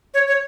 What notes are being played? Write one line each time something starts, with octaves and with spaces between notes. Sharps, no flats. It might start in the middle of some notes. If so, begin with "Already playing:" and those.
C#5
C#5